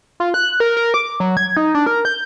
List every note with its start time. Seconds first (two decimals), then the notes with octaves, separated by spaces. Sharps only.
0.20 F4
0.34 F#6
0.60 A#4
0.77 A#4
0.94 D6
1.20 F#3
1.37 G#6
1.57 D#4
1.74 D4
1.86 A#4
2.05 G6